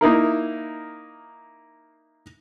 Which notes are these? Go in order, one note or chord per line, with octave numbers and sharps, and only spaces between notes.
A#3 D#4 E4 A#4